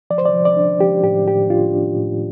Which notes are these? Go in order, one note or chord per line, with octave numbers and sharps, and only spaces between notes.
F3 D5
C5
D5
F3
D5
D4
F3 G4
A2 G4
A2 G4
D4 F4
D4
A2